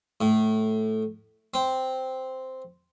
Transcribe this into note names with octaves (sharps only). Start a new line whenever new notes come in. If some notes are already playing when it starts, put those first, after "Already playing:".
A2
C4